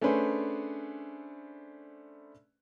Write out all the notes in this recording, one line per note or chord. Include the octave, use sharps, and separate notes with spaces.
A3 C#4 D4 G#4 B4 C5